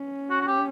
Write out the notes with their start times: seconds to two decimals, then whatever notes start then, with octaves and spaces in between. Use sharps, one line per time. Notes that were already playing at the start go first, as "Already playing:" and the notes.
Already playing: C#4
0.30 F#4
0.41 F#4
0.47 G4